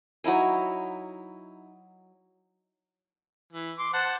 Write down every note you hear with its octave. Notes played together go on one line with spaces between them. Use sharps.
F#3 D#4 E4 G#5
E3
C6 D6
C5 F#5 A5